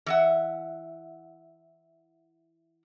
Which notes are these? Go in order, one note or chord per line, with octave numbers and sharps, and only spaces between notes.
E3 E5 F#5